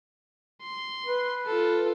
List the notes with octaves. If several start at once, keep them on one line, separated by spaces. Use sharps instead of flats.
C6
B4
F4 A4